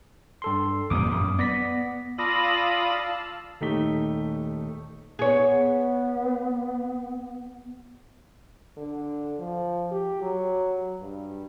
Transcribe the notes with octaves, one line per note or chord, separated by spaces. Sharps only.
G2 A4 C6
E2 A#2 G3 D6 D#6
F#2
B3 D5 A#6 B6
F4 D5 F5 A5 B5 D#6 E6 A#6
D#1 A3 D#4 G4 B6 G7
B3 G#4 C#5
D3
F3
G4
F#3
G2